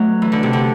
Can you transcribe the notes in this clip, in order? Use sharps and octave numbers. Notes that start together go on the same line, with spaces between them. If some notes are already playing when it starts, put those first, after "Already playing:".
Already playing: F#3 A3 B3
E3
D3
C3
D3